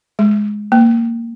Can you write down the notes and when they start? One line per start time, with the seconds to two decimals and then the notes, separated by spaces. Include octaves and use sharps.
0.19 G#3
0.72 A#3